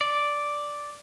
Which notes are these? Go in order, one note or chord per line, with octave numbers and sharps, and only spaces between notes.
D5